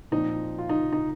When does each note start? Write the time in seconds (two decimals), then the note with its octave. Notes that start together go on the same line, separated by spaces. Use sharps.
0.11 A#2 F3 C4 D#4
0.58 F4
0.69 D#4
0.92 D#4